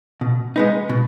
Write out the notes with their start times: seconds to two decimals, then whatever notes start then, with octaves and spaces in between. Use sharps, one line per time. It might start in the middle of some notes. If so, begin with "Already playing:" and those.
0.21 B2
0.56 G#3 B3 D#4
0.89 B2